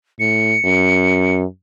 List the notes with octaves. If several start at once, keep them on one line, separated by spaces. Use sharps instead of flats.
A2 C#7
F#2